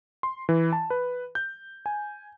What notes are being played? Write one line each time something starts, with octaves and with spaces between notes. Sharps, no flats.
C6
E3
A5
B4
G6
G#5